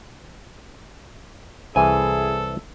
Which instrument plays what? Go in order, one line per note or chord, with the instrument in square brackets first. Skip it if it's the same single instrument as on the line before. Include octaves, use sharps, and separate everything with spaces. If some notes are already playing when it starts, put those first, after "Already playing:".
[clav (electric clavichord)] C2 E3 E5 [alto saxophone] G#4 [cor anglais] A4 [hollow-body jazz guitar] G#5